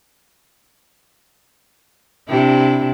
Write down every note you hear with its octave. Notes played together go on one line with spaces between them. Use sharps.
C3 D4 E4